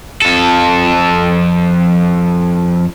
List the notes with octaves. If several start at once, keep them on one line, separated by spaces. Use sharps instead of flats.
F2 A4